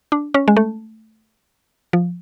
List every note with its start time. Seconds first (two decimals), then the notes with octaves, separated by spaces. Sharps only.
0.12 D4
0.34 C#4
0.48 G#3
0.57 A3
1.93 F3